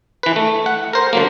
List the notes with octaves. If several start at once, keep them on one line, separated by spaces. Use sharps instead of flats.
E3 B4
A3
F#5
A#4 C5
D3 F#3 A#3